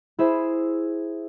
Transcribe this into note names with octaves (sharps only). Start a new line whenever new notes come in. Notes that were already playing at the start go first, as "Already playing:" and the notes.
E4 G#4 C5 E5